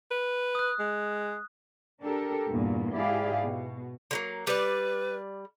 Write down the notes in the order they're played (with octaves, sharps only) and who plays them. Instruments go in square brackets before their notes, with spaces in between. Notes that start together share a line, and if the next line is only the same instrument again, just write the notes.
[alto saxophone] B4
[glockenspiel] D#6 F#6
[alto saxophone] G#3
[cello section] D4 G4 A4 A#4
E2 G2 A#2
G#2 E4 G4 G#4 D5 F5
B2
[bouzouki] D3 F#3 A#3
[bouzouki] G3 D5 [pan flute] B4